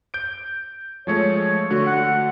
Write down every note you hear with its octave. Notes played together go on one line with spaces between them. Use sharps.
G6 D7
F3 G#3 A3 C#5
D3 A3 F#4
F#5